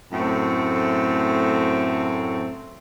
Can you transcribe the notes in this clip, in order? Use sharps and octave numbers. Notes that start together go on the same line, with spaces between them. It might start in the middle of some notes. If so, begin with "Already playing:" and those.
F#2 A2 A3 C4